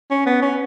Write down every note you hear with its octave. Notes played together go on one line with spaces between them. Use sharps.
C#4
B3
C#4